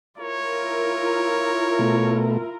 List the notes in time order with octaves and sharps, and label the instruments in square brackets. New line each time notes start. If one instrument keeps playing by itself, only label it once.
[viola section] E4 F4 A#4 [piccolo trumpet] C#5
[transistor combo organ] B2 A3